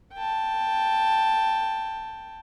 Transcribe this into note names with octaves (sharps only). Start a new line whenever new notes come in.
G5 A5